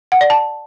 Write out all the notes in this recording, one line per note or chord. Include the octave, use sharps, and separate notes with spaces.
F#5
D5
A5